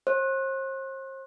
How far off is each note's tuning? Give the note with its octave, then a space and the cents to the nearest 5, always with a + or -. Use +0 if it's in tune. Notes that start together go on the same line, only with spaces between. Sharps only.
C5 +40